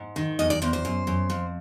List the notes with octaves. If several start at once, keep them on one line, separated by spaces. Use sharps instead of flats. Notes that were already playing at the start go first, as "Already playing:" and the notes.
Already playing: G#2
D#3
E2 D#5
D5
E2 C5
C5
F#2
F#2
F2